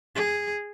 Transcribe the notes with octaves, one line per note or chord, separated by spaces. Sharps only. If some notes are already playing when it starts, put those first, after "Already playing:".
G#4